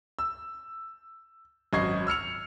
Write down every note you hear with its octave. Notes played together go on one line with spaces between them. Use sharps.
E6
G#1 F#2 D#5 C#6 G#6 C7
E6 F6 C#7 F7